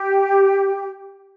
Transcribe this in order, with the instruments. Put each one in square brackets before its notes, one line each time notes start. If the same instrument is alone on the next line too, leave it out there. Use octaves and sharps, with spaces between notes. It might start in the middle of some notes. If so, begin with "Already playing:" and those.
Already playing: [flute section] G4